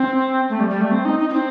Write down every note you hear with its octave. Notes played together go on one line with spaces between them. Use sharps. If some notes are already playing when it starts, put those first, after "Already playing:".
Already playing: C4
A3
G3
G3
A3
C4
D#4
D#4
D#4
C4